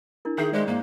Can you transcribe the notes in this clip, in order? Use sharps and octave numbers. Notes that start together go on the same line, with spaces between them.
D4 E4 A#4
D#3 G#4 E5 G#5 G6
G#3 G#4 C5 D5
G#2 A#3